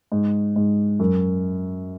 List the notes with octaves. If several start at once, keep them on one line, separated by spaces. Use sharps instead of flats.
G#2
G#2
F#2